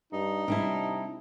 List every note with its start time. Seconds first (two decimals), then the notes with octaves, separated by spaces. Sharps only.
0.12 G2 D#4
0.48 C3 G3 D4 E4